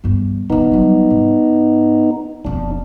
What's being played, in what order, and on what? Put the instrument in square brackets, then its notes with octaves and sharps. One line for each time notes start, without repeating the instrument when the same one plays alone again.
[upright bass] E2 G2
[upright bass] D#3 E3 [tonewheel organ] B3 D#4
[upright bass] F#3 G3
G#2
[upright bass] E1 F2 [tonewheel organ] D4